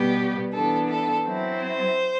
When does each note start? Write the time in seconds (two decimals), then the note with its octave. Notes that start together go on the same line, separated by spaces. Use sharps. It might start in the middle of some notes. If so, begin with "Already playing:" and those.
Already playing: B2 G3 B3 G4
0.53 E3 B3 D4 A4
0.88 A4
1.25 F#3 C4 E4
1.60 C5